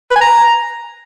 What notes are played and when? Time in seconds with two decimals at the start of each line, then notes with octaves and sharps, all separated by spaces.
0.11 B4
0.16 G#5
0.21 A#5